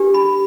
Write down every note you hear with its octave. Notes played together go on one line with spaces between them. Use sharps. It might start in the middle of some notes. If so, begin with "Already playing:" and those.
Already playing: D4 G4 B4
B5